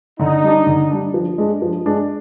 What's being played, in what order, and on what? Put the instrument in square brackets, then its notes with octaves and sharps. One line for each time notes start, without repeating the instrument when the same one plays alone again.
[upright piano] D3 [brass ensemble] D#4
[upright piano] G3 D4
D3
G3 D4
F3
G#3 D4
F3
G#3 D4